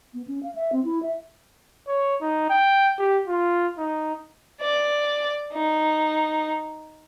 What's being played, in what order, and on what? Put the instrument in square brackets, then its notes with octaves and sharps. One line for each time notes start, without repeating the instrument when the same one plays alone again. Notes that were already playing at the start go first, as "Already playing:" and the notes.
[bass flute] B3
C#4
F5
E5
C4
E4
E5
[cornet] C#5
D#4
G5
G4
F4
D#4
[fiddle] D5
D#4